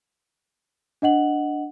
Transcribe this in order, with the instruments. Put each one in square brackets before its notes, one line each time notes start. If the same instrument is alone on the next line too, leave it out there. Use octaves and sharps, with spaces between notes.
[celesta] D4 D#5 F#5 F#7